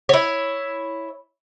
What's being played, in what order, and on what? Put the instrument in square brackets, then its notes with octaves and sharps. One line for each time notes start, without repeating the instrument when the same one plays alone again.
[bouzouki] E4 C#5